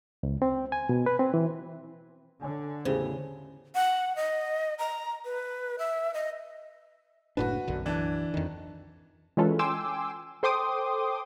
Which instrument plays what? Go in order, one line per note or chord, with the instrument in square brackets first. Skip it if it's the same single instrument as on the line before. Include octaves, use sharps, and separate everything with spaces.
[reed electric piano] C#2
C4
G#5
B2
B4
C4
E3
[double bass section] D3 [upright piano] C#5 G#5
[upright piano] E2 A2 G4 [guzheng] C#3 [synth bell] C5
[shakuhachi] F#5
D#5
A#5
B4
E5
D#5
[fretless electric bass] F#1 A2 D4 [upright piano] F#4 B4
[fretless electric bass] B1 F#2 D3
[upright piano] E3 D4
[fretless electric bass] F2 D#3
[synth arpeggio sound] E3 G#3 C#4 F4 A4 B4
G5 G#5 C6 D6 E6
A4 C5 G5 C6 D6 D#6